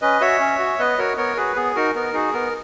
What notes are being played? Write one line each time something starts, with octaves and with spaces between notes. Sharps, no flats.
C#4 B4 D#5
F#4 C#5 E5
C#4
F#4
B3 B4 D#5
F#4 A#4 C#5
B3 A#4 C#5
F#4 G#4 B4
B3 G#4
D#4 F#4 A#4
B3 A#4
D#4 F#4 G#4
B3 A#4